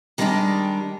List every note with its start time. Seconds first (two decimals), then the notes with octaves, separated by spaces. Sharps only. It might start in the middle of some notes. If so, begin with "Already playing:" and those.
0.18 D#3 G3 G#3 B3 D4 G4